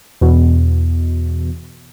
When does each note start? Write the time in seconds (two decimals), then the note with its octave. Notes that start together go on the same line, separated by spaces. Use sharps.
0.21 E2 B2